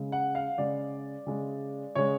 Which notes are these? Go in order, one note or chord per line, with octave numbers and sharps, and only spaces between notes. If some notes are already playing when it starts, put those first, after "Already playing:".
Already playing: C#3 G#3
F#5
F5
C#3 G#3 D5
C#3 G#3
C#3 G#3 C#5